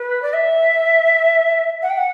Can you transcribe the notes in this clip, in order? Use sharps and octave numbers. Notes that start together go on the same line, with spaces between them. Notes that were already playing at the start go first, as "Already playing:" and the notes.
Already playing: B4
D5
E5
F#5
G5
F#5